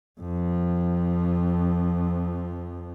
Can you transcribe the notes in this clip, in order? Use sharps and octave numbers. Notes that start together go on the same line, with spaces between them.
F2 F3